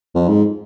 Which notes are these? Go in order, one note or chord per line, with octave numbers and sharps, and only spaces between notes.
F2
G#2